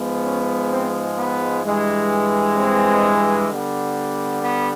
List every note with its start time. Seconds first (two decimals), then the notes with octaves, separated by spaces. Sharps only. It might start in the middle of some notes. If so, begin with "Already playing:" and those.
Already playing: G#2 F3 G#3 B3
0.24 C#4
0.71 C4
1.18 B3
1.64 G2 E3 G#3
2.57 C4
3.49 D3 G3 B3
4.41 B3